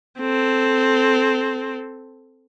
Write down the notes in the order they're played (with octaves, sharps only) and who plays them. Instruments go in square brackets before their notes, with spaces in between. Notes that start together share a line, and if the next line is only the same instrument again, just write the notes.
[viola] C4 A4